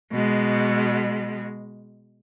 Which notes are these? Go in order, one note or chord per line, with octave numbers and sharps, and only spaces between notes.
B2 G#3